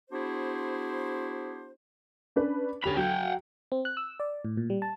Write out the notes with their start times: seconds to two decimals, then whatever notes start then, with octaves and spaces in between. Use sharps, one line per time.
0.11 B3 D4 E4 F#4 G#4 C5
2.36 C#4 D4 B4
2.84 D2 C#4 G4 B5 F7
2.97 F#3 F#5 G5
3.72 C4
3.85 F#6
3.97 E6
4.20 D5
4.45 A2
4.57 A#2
4.70 G3
4.82 A5